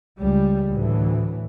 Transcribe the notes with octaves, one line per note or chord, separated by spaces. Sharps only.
C#2 G3
D2 A2 E3